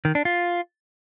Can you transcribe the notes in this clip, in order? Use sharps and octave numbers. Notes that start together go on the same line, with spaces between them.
D#3
D4
F4